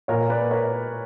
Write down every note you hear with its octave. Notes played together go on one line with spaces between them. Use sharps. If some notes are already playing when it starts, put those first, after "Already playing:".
A#2 A#4 C#5
B4 D5
A#4 C#5